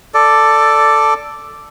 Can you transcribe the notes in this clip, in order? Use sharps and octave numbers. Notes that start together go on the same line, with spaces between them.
A4 D5